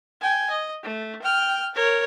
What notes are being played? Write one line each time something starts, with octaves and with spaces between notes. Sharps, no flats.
G5 G#5
D#5
A3
G5 F6
A#4 C#5